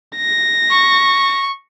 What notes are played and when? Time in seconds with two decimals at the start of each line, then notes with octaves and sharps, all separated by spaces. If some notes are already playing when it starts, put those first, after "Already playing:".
0.17 A#6
0.70 C#6